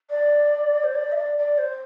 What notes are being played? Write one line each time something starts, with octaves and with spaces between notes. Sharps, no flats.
D5
C5
D5
E5
D5
D5
C5